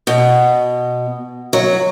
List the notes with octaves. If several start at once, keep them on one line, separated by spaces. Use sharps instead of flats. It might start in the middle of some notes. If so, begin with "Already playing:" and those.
B2
F#3